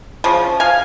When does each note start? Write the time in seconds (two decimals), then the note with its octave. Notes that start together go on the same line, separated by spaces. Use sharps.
0.24 C#3 F3
0.60 F5 G#5